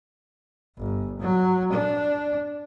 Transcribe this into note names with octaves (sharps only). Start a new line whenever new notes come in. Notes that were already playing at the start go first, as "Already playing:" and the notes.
G1
F#3
D4